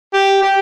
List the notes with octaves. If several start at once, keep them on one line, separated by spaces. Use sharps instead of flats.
G4
G4